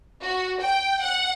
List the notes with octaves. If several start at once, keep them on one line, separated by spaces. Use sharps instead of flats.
F#4
G5
F#5